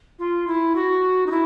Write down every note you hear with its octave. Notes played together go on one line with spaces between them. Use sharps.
F4
E4
F#4
D#4
E4